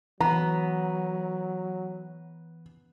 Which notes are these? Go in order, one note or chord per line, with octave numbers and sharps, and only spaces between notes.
E3 F#3 B3 A#5